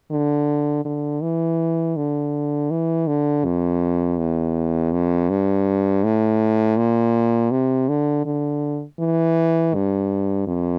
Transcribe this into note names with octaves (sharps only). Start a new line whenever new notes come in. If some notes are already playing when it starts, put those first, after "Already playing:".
D3
D3
E3
D3
E3
D3
F2
E2
F2
G2
A2
A#2
C3
D3
D3
E3
G2
F2